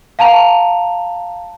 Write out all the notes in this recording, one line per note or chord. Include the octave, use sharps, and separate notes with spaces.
F5 A5 A#5 F7